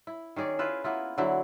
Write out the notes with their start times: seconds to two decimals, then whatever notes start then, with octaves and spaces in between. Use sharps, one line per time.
0.07 E4
0.36 D#3 C#4 G#4 D5
0.59 E4 F4 B4 E5
0.84 A#3 B3 E4 F4
1.18 D3 F#3 E4